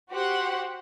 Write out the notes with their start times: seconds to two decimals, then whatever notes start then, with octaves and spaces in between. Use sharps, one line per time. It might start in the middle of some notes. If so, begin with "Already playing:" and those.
0.10 F#4 G4 C5 F#5